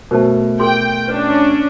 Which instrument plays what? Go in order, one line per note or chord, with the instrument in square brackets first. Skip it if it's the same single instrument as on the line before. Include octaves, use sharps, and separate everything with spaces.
[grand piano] B2 A3 [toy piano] A#4 C5 A5
[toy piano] G#4 A#4 C6 [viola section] G5
[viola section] C#4 D4 [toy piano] B4